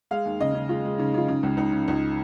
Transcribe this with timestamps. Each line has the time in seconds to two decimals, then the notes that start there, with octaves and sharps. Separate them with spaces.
0.11 G#3 F5
0.25 D#2
0.41 C#3 D#5
0.54 C#3
0.69 G#3 F4
0.85 G#3
0.98 C#3 D#4
1.14 C#3 F4
1.28 C#3 D#4
1.43 C#2
1.57 C#2 D#4
1.72 C#3
1.88 C#2 D#4